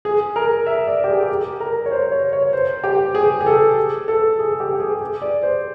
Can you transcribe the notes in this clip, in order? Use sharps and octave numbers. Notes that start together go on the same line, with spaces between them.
G#4
A#4
E5
D5
G4
G#4
G4
G#4
A#4
C#5
C5
C#5
C#5
C5
G4
G#4
G#4
A4
A4
G#4
G4
G#4
G#4
D5
C5